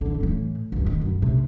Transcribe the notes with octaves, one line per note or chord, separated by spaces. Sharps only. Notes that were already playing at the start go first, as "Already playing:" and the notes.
D3 E3
A2 E3
C#2 F#2
D#3
F#2
C3 D4